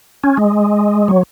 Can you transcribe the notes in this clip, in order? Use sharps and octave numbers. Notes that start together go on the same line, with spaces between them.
C#4
G#3
F#3